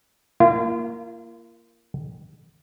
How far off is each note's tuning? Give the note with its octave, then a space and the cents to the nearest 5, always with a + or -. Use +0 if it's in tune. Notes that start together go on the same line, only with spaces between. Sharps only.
A#3 +0 F4 -40